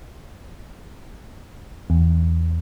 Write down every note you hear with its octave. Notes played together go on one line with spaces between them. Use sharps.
E2